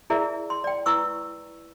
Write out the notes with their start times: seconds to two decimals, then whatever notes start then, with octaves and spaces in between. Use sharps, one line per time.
0.10 E4 G#4 A#4 D5 E5
0.50 C6
0.64 D5 G5
0.86 E4 B4 C#6 E6